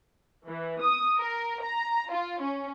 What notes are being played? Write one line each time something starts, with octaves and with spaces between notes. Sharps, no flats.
E3
D#6
A#4
A#5
F4
C#4